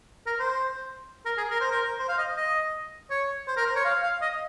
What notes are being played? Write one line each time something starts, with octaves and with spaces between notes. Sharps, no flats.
A#4
C5
A#4
G#4
A#4
C5
A#4
C5
F5
D#5
D#5
C#5
C5
A#4
C5
C#5
F5
F5
D#5